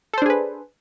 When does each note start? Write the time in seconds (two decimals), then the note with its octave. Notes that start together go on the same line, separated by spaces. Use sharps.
0.14 A4
0.18 C5
0.22 D4
0.26 G#4
0.30 B4